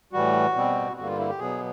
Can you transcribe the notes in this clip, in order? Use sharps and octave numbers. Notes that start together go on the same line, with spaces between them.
A2 E3 G3 F#4
B2 G3 C4
G2 D3 G3 A#3 F#4
F4
E4
G4
B2 F#3 B3 G#4